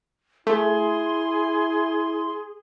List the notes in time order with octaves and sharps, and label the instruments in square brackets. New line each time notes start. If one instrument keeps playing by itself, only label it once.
[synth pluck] A3 [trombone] E4 [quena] G#4 [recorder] C6